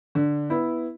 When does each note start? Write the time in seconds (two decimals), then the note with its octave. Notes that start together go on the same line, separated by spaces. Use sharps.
0.15 D3
0.50 B3 E4